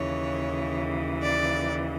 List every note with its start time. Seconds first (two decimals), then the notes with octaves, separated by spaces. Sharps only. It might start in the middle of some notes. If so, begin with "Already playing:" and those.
Already playing: D#2 C#3 E3 C#5
1.23 D5